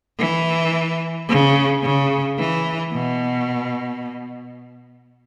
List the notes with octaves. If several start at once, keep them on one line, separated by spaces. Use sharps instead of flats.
E3
C#3
C#3
E3
B2